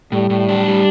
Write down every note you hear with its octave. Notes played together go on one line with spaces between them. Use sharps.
A2 G3
A2
D4
A2